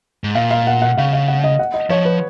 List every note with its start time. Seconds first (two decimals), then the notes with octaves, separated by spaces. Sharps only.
0.24 G#2
0.35 A#2 F5
0.51 F5
0.67 F#5
0.82 F#5
0.97 C#3 F5
1.13 F5
1.28 F#5
1.44 D#5
1.59 F#5
1.74 D#5
1.90 F3 C#5
2.05 B4